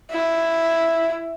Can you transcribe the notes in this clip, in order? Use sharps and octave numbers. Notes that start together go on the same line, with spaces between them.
E4